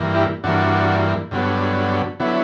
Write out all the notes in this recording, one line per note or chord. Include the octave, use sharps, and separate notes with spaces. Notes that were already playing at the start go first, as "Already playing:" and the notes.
Already playing: G2 E3 A#3
E4 G4
G2 E3 A#3 D4 F#4
G2 D3 F#3 B3
D3 F#3 B3 E4